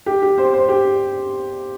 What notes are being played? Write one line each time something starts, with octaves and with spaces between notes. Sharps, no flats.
G4
G4
C5
C5
G4